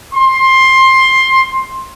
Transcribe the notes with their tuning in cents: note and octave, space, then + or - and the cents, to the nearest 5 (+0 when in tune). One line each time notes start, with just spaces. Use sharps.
C6 +15